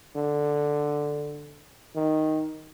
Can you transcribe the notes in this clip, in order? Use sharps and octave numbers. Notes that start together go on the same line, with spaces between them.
D3
D#3